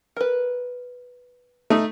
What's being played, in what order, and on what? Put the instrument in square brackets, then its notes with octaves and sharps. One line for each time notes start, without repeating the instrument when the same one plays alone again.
[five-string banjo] A#4 B4
[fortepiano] A3 D#4